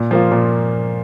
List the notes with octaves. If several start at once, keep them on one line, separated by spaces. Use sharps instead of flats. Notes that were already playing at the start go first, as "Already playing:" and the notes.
Already playing: A#2
F3 A#3 F4
A#2